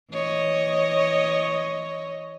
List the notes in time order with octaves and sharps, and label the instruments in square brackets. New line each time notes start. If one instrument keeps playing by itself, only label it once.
[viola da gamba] E3 C#5 D#5